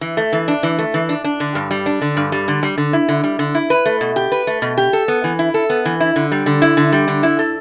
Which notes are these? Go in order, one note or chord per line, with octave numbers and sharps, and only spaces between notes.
E3
A3
E3
D4
E3
A3
E3
D4
D4
D3
G2
G3
D4
D3
G2
G3
D3
G3
D3
E4
D3
G3
D3
E4
B4
A3
B2
G4
B4
A3
B2
G4
A4
B3
E3
E4
A4
B3
E3
E4
D3
G3
D3
E4
D3
G3
D3
E4
A4